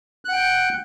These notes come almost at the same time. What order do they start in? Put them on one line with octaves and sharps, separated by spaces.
F#6 F#5 G5 G6